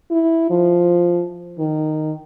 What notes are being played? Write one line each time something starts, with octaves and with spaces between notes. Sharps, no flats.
E4
F3
D#3